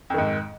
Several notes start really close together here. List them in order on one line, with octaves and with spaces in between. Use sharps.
F2 D#3 G#2